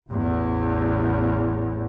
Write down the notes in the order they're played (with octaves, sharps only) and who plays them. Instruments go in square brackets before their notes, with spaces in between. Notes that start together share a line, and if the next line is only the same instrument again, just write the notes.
[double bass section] A1 E2 A2